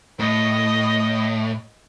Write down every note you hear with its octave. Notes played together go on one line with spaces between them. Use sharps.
A2 D#5